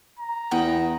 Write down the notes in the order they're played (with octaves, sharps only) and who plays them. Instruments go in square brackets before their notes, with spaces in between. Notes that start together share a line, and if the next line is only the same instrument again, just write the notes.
[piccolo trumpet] A#5
[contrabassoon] E2 [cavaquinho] F#5 G5 D#6